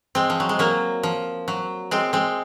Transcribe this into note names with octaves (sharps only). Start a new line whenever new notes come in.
G#3 C4
F3
F#3
G#3
F#3 A#3
F3
F#3
G#3 C4
G#3 C4